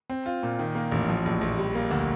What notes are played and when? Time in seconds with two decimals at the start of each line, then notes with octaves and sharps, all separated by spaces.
0.10 C4
0.26 F4
0.43 A#2
0.59 D#3
0.75 A#3
0.92 A1
1.09 F3
1.25 A#1
1.41 A#1
1.58 G3
1.75 A#3
1.91 D2